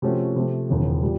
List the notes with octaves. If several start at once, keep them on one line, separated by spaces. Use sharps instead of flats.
C3 F3 A3 C#4 F#4
C3 F3 A3
E1 D#2 C#3 F3
A#2 G3